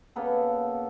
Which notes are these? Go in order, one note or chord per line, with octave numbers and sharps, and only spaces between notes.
C#3 A#3 B3 A4